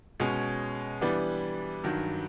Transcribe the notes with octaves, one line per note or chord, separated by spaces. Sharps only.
B2 G#3 C#4
E3 G3 B3 D4
G2 D#3 F#3